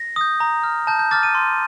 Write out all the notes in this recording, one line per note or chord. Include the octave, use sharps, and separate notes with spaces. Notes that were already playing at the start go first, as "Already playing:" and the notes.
Already playing: A#6
D#6 G6
A#5
F6
A5 G6
G6
D6 F6 A6
D#7
C6